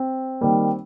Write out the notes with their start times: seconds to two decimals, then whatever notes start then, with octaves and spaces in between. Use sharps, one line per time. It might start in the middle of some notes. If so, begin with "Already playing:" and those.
Already playing: C4
0.41 D#3 G3 A#3